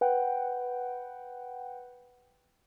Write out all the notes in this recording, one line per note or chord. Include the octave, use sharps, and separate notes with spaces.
B4 F#5 G5